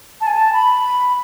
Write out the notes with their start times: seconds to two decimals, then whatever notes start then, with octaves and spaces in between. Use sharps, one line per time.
0.21 A5
0.27 G#5
0.34 A5
0.53 B5